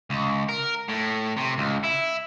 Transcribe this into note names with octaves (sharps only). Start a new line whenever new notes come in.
C#2
A#4
A2
C3
C#2
E4